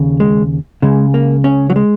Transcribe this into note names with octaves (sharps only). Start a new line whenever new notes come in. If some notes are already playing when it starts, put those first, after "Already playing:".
Already playing: D#2 C#3
G#3
C#2 C#3 G#3
A#3
C#4
F#3
G#3